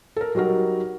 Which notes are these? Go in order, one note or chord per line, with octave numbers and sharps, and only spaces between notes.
A4 A#4
F#3 G3 D#4 F#4 A#4